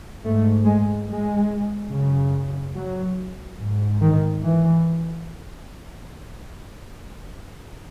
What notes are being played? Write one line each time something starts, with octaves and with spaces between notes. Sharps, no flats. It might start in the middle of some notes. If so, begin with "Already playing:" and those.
G#2 A3
G#3
G#3
F#2 C#3
F#3
G#2
D#3
E3